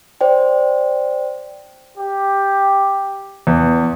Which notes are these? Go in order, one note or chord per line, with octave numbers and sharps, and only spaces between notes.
C5 D5 G5
G4
E2